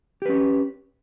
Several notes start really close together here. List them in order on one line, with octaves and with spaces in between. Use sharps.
G4 B4 C#4